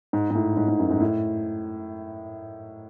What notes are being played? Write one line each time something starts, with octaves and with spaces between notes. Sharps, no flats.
G#2
G#2
A2
G#2
G#2
F#2
G#2
A2